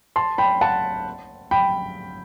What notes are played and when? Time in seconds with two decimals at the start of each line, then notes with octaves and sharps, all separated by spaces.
0.16 A5 C6
0.38 G5 B5
0.61 F#5 A5
1.51 G5 B5